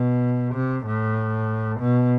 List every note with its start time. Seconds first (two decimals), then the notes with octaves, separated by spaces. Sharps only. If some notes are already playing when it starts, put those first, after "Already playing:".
Already playing: B2
0.54 C3
0.86 A2
1.80 B2